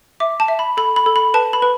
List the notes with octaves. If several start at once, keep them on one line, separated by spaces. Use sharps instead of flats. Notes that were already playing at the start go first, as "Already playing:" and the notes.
E5 D6
A5
E5
B5
A4 B5
B5
A4
B5
B4 A5
B5
B4